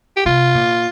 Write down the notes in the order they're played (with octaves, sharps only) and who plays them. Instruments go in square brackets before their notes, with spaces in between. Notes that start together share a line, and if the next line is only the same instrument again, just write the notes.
[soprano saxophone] G4
[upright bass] C3 [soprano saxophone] F4
[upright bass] A#2